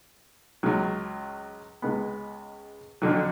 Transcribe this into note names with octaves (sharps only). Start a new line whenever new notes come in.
C#2 C#3 F#3
C#2 C#3 G#3 B3
F2 D3 F#3